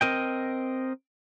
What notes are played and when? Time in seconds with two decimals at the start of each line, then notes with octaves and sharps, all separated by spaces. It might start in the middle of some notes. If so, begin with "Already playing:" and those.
0.01 C4 A#4 D#5 G5